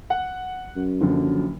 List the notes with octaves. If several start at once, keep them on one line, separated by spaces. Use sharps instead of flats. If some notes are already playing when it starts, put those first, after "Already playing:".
F#5
F#2
F#1 D3 F3